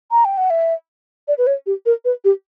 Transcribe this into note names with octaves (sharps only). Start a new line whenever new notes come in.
A#5
G5
F#5
E5
D5
B4
C#5
G4
A#4
B4
G4